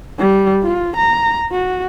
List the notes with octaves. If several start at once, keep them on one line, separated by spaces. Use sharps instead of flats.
G3
F4
A#5
F#4